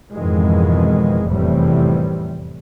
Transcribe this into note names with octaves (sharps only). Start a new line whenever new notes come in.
F2 G#2 B2 D#3 E3 G#3
F1 E2 A2 C3 E3 G3